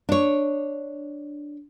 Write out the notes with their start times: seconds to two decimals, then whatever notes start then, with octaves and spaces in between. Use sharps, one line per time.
0.09 D4 C#5